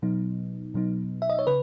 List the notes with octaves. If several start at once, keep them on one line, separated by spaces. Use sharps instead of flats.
B2 F#3 B3 D#4
B2 F#3 B3 D#4
E5
D#5
C#5
C#3 B4